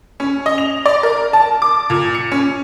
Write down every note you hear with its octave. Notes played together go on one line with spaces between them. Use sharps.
C#4
D#5
F7
D5
A#4
A5
D6
A#2
C#7
C#4